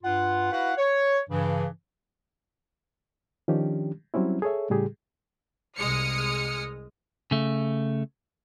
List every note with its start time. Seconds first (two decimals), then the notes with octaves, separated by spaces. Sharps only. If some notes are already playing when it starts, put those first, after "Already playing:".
0.03 G2 F4 F#5
0.51 E4 F#4 B4 F5 F#5
0.77 C#5
1.29 G2 C#3 E3
3.48 D#3 F3 C#4 D4 G4
4.14 F#3 G3 C4 C#4 E4
4.42 G#4 A4 C#5 E5
4.70 A2 C#3 G3 G4 G#4
5.77 C2 G#3 D#6 F6 C#7
7.31 C#3 A3